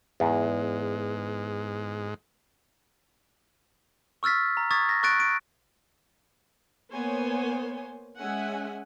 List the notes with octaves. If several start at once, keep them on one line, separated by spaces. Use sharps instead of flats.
E2 G#2
C#6 E6 F6 A6 B6
A#5
C#6 D#6 G#6 A6 B6
A#6
C#6 F#6 A6 D7
D7
A#3 B3 C5 C#5 G#5
G#3 C#4 E5 F#5 G#5